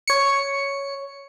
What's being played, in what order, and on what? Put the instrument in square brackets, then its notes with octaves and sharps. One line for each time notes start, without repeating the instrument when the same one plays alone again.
[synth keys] C#5 C#7